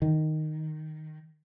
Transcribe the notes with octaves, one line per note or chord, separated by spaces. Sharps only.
D#3